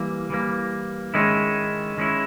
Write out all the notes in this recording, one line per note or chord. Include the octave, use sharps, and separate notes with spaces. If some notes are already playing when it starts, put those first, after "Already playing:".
Already playing: E3 G3 A#3
E3 G3 A#3
D#3 G#3 C#4 E4
D#3 G#3 C#4 E4